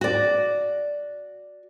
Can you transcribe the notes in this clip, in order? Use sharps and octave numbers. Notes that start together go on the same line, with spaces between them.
F#4 D5